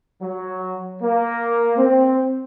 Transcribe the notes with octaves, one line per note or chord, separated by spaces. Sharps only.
F#3
A#3
C4